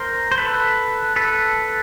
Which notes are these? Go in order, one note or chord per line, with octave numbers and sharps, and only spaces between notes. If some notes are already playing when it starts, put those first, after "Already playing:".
Already playing: A#4 C5
C5
A4 B4
A4 B4